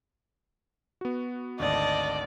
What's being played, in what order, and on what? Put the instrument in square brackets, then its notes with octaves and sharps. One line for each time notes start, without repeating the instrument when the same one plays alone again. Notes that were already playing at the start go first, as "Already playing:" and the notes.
[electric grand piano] B3 F#4
[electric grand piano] G#1 D2 [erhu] D5 [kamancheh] D#5 A5